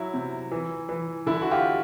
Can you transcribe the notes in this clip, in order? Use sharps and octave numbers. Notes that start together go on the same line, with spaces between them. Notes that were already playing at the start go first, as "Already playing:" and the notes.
Already playing: F#3 E4
C3
E3
E3
D3 E4
F#4
F4 G4